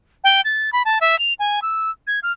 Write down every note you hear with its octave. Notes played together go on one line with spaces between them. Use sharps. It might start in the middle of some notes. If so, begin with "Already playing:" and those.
G5
A6
B5
A5
E5
F7
G#5
E6
G#6
F6